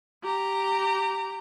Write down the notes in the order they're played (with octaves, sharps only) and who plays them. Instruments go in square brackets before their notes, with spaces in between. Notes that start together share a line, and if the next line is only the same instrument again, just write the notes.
[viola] G4 A#5